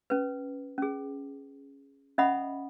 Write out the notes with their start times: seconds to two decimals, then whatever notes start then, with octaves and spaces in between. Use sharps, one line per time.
0.10 C#4 B4
0.78 C#4 G#4
2.18 C#4 D#5 E5 F#5 B5 D#6